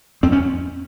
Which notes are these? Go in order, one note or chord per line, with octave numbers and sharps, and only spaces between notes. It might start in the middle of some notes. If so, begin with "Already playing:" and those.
F2 C4
C#4